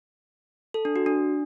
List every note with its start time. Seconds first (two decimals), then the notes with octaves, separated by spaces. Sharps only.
0.74 A4
0.85 D4
0.96 F#4
1.06 D4